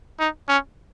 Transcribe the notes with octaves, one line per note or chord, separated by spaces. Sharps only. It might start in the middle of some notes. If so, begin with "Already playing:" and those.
D#4
C#4